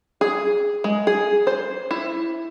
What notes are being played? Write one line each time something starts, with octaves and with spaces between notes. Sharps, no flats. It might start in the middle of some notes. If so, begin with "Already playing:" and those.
G#4
G#3
G#4
C5
E4